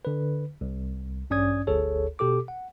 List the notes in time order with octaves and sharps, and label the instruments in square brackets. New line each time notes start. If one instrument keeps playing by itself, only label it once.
[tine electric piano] D3 B4
C2
A1 G2 C#4 D5 D#6 G#6
G1 D2 G#4 A4 C#5
B2 G4 A4 D6
F#5